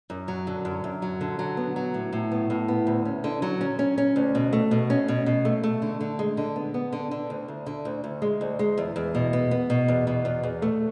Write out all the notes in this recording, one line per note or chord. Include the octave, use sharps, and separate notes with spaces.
F#2
F#3
D3
F#2
F#2
F#3
D3
F#3
B3
F#3
A2
A2
B3
A2
B3
D2
C#4
D3
F#3
C#4
C#4
C#4
D2
B2
A3
B2
C#4
B2
B2
A3
A3
D3
D3
G#3
D3
B3
B3
D3
D3
D2
D2
D3
D2
D2
G#3
D2
G#3
E2
E2
B2
B3
B3
B2
E2
B2
E2
E2
A3